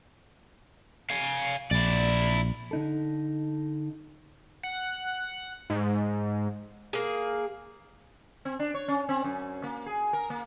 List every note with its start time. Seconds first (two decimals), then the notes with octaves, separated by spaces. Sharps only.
1.10 F5 G#5
1.71 A#1 E4 D5
2.71 D3 D#4 A4
4.63 F#5
5.70 G#2
6.93 A#3 G#4
8.45 C4
8.59 D4
8.74 C#5
8.88 C#4
9.09 C4
9.24 F#2
9.64 A#3
9.86 G#4
10.13 A#4
10.30 A#3